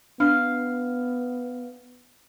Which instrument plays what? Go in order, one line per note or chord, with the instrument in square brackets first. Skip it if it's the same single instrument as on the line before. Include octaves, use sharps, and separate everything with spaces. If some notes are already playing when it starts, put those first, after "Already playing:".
[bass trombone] B3 [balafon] D4 [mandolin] F5